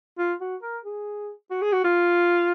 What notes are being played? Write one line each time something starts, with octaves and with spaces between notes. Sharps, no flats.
F4
F#4
A#4
G#4
F#4
G#4
F#4
F4